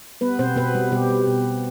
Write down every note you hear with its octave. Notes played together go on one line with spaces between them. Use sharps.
G3 B3 B4
B2 C4 C5
B2 B3 B4
G3
B2 G3 G4
G3
B2
B2